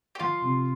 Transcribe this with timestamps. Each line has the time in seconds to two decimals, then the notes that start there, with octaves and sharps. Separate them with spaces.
0.15 G4
0.20 F3 F4
0.42 C3